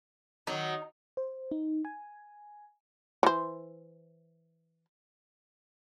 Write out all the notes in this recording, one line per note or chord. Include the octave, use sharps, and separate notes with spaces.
D#3 F#3 D#4
C5
D#4
G#5
E3 C5